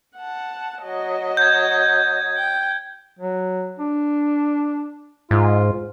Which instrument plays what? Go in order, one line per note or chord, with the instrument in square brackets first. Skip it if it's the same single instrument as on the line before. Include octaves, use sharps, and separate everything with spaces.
[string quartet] F#5 A5
F#3 D#5
[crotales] G6 G#6
[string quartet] G5
[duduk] F#3
D4
[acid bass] G#2 [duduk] F4